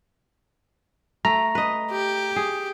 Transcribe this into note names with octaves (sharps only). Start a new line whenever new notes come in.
A3 A#5
B4 D#5
G4
G#4